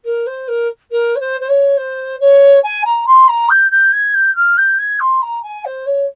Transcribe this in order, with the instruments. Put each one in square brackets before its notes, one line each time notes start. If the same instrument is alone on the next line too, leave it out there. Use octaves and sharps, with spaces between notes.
[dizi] A#4
C5
A#4
A#4
C#5
C5
C5
C#5
C5
C#5
G#5
A#5
C6
A#5
G6
G6
G#6
G6
F6
G6
G#6
C6
A#5
G#5
C5
C#5